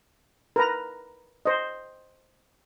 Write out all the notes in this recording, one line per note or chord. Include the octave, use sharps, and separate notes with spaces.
A#4 B4 A#5
C5 D#5